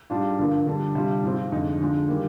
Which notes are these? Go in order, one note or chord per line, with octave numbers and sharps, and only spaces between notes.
G#2 G3 D4 F4
G2 D3 F3 A#3 F4
D3 G3 D4
C3 G3 D4 F4
G#2 F3 C4 F4
F2 D3 G#3 D#4
D3 F3 G#3 D#4
D#3 G3 A#3